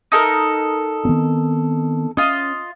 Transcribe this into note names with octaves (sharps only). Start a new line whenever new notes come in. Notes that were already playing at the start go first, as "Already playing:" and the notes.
D#4 A4 A#4
D#3 B3 C4
C#4 F4 D#5